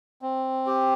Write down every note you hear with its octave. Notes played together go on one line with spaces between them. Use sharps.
C4
G4